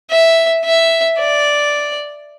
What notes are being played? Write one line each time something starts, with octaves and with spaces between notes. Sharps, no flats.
E5
E5
D5